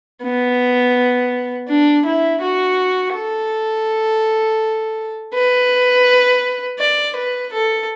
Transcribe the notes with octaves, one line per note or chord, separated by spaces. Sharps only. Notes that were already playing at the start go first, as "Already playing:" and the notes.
B3
D4
E4
F#4
A4
B4
D5
B4
A4